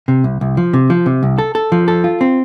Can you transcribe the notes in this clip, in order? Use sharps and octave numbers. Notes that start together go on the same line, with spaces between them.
C3
C2
C2
F3
C3
F3
C3
C2
A4
A4
F3
A4
F4
C4